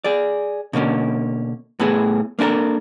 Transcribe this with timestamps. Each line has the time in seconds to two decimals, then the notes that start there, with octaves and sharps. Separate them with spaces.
0.04 G#4 D5
0.73 B2 D3 A#3 C#4
1.79 A2 B3 E4 G#4
2.39 A#3 D4 E4 A4 A#4